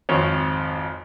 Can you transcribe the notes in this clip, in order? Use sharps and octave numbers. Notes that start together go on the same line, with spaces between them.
G#1 F2 C4 C#5